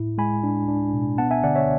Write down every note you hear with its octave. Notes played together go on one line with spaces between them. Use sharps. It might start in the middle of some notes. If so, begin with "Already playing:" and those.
Already playing: A2 E4
G#3 G#5 B5
D4
D4
B2
B3 F#5 A5
E5 G#5
D3 D5 F#5
C#5 E5